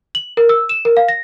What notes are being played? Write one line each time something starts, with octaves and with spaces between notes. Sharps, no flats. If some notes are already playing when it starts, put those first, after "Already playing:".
F#7
A#4
E6
E7
A#4
F5
A#6